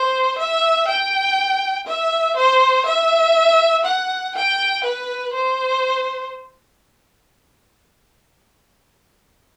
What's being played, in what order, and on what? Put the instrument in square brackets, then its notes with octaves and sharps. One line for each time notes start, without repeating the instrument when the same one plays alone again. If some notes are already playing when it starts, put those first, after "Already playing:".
Already playing: [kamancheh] C5
E5
G5
E5
C5
E5
F#5
G5
B4
C5